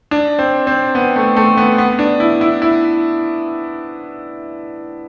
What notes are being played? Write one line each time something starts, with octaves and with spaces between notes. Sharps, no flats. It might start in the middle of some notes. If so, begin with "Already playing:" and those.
D4
C4
C4
B3
A3
A3
B3
B3
D4
E4
E4
E4